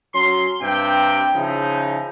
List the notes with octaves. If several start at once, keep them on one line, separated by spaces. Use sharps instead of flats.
F#3 C#4 C6
G2 C3 G5
C#3 F3 D#4 E4